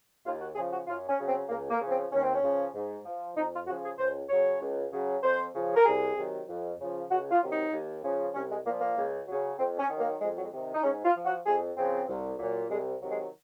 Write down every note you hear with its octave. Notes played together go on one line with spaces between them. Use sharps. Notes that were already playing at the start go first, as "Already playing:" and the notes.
D#2 F4
F#4
C#3 F3 G#4
F#4
F#2 F4
C#4
C#3 F#3
C4
C#2 A#3
A#3
C#3 F3
C4
D#2 C#4
C4
C#4
C#3 F3
G#2
F3
F2 D#4
F4
C#3 F3 F#4
G#4
C#2 C5
C#3 F#3 C#5
C#2
C#3 F#3
F2 C5
C#3 F3
A#4
C2 G#4
C3 D#3 F#3
F2
C#3 F3
C#2 F#4
F4
C3 D#3 F#3
D#4
D#2
C#3 F3
C2 C#4
G#3
A#2 F3 A#3
A#3
C#2
C#3 F#3
F2 C4
C#4
D#3 F#3
A#3
F2 G#3
F#3
G#3
C3 D#3
D#4
G#2 C#4
F4
F3
F#4
F2 G#4
C#3 F3 C4
C2
A#2 F#3
C2 G#3
C3 D#3 F#3
G#3